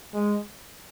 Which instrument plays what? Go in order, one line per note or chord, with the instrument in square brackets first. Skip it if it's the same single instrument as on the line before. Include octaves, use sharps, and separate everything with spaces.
[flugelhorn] G#3